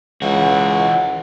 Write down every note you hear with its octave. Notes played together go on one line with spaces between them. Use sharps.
C#2 E3 F#4